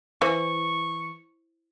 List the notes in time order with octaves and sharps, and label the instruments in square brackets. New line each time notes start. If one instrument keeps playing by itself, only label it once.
[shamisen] E3 [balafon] E4 C5 [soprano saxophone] C#6